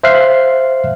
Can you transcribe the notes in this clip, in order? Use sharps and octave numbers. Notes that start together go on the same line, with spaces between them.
C5 E5 F5 F#6 C7